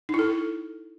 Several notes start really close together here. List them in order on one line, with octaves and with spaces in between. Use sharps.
D#4 E4 A4